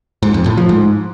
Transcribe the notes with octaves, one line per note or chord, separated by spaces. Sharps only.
G#2
F2
A2
F3
G#2